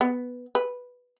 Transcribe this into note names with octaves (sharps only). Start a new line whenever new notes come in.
B3
B4